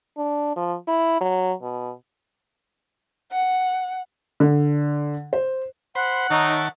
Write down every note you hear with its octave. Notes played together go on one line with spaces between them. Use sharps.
D4
F3
E4
F#3
B2
F#5
D3
C5
C5 F#5 B5
D#3 D#4 A#4 C#5 E5 A5